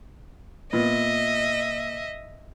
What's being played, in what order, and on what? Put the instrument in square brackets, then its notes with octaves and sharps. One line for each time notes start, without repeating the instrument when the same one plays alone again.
[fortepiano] A#2 B3 [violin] D#5 E5